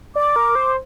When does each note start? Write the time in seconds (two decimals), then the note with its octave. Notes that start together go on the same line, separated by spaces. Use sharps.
0.16 D5 D6
0.36 A#4
0.55 C5